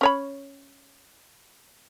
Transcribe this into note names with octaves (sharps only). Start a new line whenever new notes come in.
C#4 C#5 B5